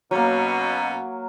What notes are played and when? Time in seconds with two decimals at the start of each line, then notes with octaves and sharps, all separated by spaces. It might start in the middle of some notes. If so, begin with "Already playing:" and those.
0.11 B2 F#3 A#3 C#4